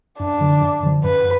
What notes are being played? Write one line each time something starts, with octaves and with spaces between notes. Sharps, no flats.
F#2 D4
D3 F3
F#2
D3 F3
F#2 B4